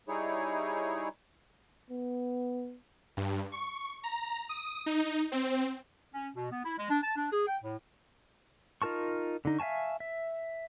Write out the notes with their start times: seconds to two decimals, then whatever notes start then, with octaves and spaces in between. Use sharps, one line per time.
0.08 G3 D#4 E4 G#4 C#5
1.90 B3
3.17 G2
3.52 C#6
4.04 A#5
4.49 D#6
4.86 D#4
5.32 C4
6.13 C#4
6.34 B2
6.51 B3
6.64 E4
6.77 G#3
6.90 D4
7.03 A5
7.16 D4
7.31 G#4
7.47 G5
7.63 A2
8.82 D#4 F4 A#4 A5 C#6
9.45 D3 D#4
9.59 E5 F5 G#5 A5 C#6
10.00 E5